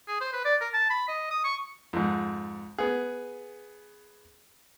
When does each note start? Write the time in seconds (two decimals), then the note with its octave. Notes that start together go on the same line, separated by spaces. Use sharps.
0.08 G#4
0.21 C5
0.33 B4
0.45 D5
0.61 A#4
0.74 A5
0.90 B5
1.08 D#5
1.31 D#6
1.44 C#6
1.93 F2 G#2
2.78 B3 G#4